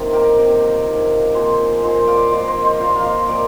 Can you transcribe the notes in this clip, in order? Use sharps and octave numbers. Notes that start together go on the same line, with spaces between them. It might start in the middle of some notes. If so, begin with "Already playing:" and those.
Already playing: C3 D#3 A#3 F4
G4 A#4
C3 D#3 A#3
C3 D#3 A#3
A#2 F3 A#3 G#4 C5
A#2 F3 A#3 C5 D#5
D5 F5
A#2 F3 A#3 C5 D#5
C5 D#5
C5 D#5
A#2 F3 A#3 D5 F5
F5
C5 D#5
A#2 A#4 D5